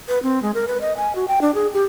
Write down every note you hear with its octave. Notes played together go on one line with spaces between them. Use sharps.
B4
C4
G#3
A#4
B4
D#5
G#5
F#4
G5
D4
G#4
G4